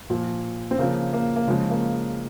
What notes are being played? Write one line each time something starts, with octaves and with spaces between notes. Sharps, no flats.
A#2 F3
C4
C#3 F3 A#3
A#3
A#3
C#3 F3 G#3
A#3